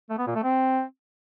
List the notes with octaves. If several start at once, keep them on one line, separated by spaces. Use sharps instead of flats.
A3
B3
A#2
A3
C4